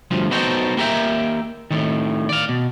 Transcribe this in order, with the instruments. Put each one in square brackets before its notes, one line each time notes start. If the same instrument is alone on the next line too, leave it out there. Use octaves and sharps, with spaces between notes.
[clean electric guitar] D2 G2 F3
B3 D#4 F#4 A4 C5 G5
A#3 G4 A#4 B4 E5 G5
A2 D#3
D5 F5
B2